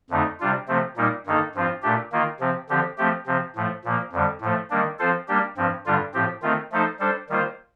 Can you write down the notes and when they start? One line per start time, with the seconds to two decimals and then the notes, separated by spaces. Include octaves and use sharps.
0.10 F2 D3 A3 D#4
0.40 C3 G3 D4 F4
0.68 C3 F3 A3 C4
0.97 A#2 G3 A#3 D#4
1.26 G2 D#3 A#3 D#4 A4
1.55 G2 F3 C4 F4
1.83 A#2 A3 D4 G4
2.12 D#3 A#3 F4
2.40 C3 F3 C4
2.69 D3 F3 C4 G4
2.98 F3 A3 C4 G4
3.27 C3 F3 C4
3.56 A2 F3 A3
3.85 A#2 F3 A#3
4.12 F2 D3 G3
4.41 A2 F3 A3
4.70 D#3 G3 A#3 D4
4.99 F3 C4 F4 A4 C5
5.28 G3 A#3 D4 G4
5.57 G2 F3 C4
5.86 G2 D3 G3 D4 F4
6.14 A2 F3 C4 G4
6.42 D#3 A3 C4 F4
6.72 F3 A3 D#4 A4 C5
7.00 G3 D4 A4 C5
7.29 D#3 G3 A#3 F4 C5